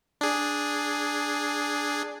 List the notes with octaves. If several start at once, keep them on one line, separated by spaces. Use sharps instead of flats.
D4 G#4